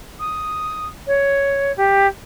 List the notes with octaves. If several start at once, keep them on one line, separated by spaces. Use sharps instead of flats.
D#6
C#5
G4